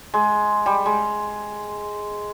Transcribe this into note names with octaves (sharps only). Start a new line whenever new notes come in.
G#3
G3
G#3